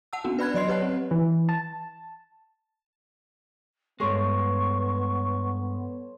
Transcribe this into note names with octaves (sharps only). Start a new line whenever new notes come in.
F#5 A5 E6
B3 C#4 D4 F#4
B4 D5 B5 F#6 G#6
F#3 D5 D#5 C6 C7
G4 B4 C#5 F#5 A5 F#6
C4
E3
A5
G2 G#3 B3 A4 C5 C#5 C#6